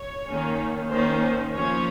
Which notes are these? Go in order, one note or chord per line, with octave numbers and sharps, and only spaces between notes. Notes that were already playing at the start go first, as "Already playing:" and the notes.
Already playing: C#5
D#3 A#3 C#4
D#3 A#3 C#4 C5
F3 A#3 C#4 C#5